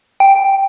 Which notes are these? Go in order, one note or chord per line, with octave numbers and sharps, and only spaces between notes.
G5